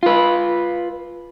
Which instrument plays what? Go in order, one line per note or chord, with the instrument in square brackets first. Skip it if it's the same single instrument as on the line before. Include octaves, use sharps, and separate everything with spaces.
[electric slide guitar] F4 B4